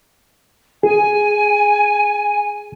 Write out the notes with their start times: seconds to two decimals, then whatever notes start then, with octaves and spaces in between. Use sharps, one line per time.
0.83 G#4 G#5